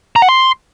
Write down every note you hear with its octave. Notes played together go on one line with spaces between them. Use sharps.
A#5
F#5
C6